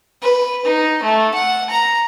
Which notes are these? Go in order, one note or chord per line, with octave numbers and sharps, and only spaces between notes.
B4
D#4
A3
F#5
A#5